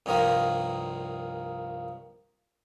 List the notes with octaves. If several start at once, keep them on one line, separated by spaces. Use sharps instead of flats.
C2 G2 D#3 F3 A#3